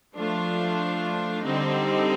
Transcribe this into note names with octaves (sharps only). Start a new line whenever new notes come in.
F3 A3 D4 F4
D3 G3 C4 D#4